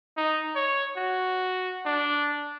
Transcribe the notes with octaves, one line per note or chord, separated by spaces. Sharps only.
D#4
C#5
F#4
D4